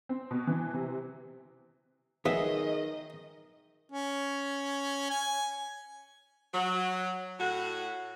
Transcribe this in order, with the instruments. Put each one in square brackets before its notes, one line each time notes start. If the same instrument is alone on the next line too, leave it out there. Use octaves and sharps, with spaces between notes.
[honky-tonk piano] C4
B2
E3
C3
[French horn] D#3 [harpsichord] F#3 B3 [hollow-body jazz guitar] G#4 E5 [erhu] D#5
[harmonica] C#4
G#5
[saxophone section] F#3
A2 F#4